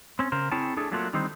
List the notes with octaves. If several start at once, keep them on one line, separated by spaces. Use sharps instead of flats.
C4 C#4
C#3 A#4 C5
C4 E4 G#4 C#5 G5 A5
A3 D4 G#4 A4
F#3 A3 A#3 D4 F4
D3 D#3 G3 C4 D#4 C5